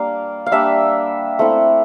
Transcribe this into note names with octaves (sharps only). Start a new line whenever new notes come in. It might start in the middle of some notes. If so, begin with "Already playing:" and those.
Already playing: G3 A#3 D4 F5
F5
G3 A#3 D4 E5
A3 C4 E4